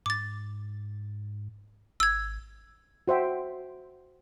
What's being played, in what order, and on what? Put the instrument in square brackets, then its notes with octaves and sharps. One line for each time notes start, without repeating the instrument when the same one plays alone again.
[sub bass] G#2 [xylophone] D6 A6
[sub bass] G#1 [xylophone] E6 G#6
[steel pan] F#4 C5 E5 G5